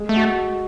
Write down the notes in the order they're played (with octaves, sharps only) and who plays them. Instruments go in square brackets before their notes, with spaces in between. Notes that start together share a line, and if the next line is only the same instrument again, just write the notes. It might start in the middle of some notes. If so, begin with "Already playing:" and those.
Already playing: [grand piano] G#3
[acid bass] A3
[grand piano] F#4